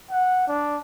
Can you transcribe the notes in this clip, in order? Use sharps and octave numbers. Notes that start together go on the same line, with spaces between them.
F#5
D4